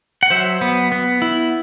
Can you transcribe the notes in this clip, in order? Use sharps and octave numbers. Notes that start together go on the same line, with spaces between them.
F#5
F#3 C5 E5
B3
B3
E4